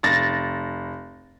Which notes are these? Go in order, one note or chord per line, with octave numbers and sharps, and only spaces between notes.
F1 A6 A#6